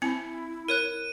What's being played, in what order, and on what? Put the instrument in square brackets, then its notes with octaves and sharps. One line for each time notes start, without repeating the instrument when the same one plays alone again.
[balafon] C4 G#5 [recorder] E4 [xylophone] C#7
[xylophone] A#4 C#5 F#6 [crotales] D#7